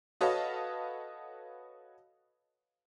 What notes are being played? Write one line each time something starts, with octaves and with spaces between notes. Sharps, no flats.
F#4 A4 B4 C#5 D#5 F5